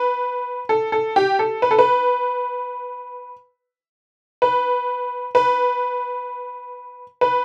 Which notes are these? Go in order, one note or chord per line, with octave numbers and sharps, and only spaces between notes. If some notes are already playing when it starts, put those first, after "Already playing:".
Already playing: B4
A4
A4
G4
A4
B4
A4
B4
B4
B4
B4